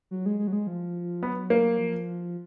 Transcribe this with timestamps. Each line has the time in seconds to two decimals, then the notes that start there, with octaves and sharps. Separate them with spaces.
0.11 F#3
0.26 G#3
0.39 G#3
0.47 F#3
0.53 G#3
0.67 F3
1.23 F#3 B3
1.50 A#3
1.78 F3